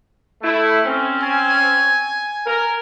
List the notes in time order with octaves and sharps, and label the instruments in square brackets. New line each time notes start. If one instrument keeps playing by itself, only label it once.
[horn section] A3 E4
C4 C#4
[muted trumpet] G#5
[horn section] A#4